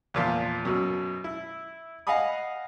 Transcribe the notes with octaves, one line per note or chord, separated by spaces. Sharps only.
E2 A#2 F3
F#2 B2
E4
D#5 F5 F#5 G#5 B5 D#6